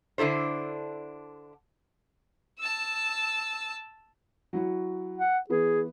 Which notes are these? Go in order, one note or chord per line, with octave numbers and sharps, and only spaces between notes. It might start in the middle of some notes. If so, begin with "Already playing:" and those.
D3 D4 E4 A4 C5
A5 E6
F#3 E4 F#4
F#5
E3 B3 G#4